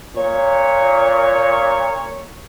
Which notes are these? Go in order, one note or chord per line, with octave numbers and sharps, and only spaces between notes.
A#2 C#5